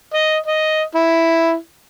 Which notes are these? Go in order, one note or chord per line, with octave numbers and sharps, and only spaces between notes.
D#5
D#5
E4